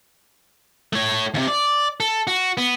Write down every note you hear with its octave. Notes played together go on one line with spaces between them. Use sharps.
A3 C#5
D#2 C3
D5
A4
F#4
B3